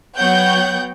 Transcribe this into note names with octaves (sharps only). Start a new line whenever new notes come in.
F#3 B3 C#5 F#5 G5 G6